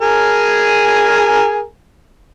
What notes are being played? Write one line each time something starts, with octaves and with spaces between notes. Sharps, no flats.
G#4 A#4 G#5